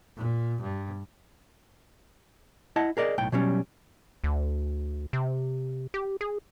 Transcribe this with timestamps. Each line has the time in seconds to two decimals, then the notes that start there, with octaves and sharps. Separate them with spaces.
0.17 A#2
0.62 G2
2.76 E4 D#5 F#5 A5
2.97 G#4 A#4 D5 D#5
3.18 B1 A2 G5
3.32 B2 F#3 G3 C#4
4.24 D2
5.13 C3
5.94 G4
6.21 G#4